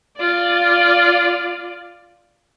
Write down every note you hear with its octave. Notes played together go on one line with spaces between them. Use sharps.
F4 D5